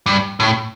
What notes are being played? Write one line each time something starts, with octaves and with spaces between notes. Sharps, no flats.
G2
A2